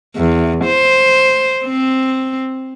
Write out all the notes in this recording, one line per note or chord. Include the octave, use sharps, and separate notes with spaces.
E2
C5
C4